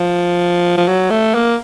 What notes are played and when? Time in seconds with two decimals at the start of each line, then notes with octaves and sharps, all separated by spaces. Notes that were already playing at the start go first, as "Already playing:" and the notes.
Already playing: F3
0.77 F3
0.88 F#3
1.10 A3
1.34 A#3